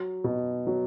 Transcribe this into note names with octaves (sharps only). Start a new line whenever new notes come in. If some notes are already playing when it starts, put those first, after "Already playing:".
Already playing: F#3
B2
F#3